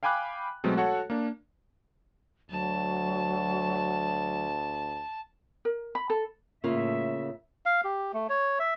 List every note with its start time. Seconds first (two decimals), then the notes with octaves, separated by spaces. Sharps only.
0.03 F5 G5 G#5 B5 D6 F#6
0.64 B2 F#3 G#3 A3 C4
0.77 F#4 A4 C#5 F#5
1.10 A#3 D4
2.50 D2 F#3 A5
5.65 A#4
5.95 B5
6.10 A4
6.64 A2 C#3 A#3 F4 E5
7.66 F5
7.84 G4
8.13 A3
8.29 C#5
8.59 E5